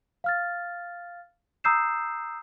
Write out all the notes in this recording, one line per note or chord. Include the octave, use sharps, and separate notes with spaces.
F5 F6 A6
A#5 D#6 E6 G6 C7 E7